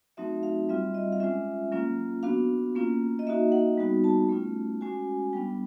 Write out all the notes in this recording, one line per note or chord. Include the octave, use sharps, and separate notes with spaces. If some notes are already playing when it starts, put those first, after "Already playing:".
F#3 A3 C4 D#4 F#4 E5
F5
G3 C4 F4 E5
D#5
F5
G#3 C#4 F4 E5
F#3 A#3 C#4 F4
B3 D4 F#4 F5
A#3 C#4 F4
D#5
A#3 D#4 F#4 E5
F#5
G3 B3 D#4 F#4
A5
A3 C#4 F4
G#3 C#4 F#4 G#5
G3 B3 D4 G5